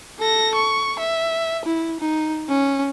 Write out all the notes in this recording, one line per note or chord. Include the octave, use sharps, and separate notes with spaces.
A4 A#6
C#6
E5
E4
D#4
C#4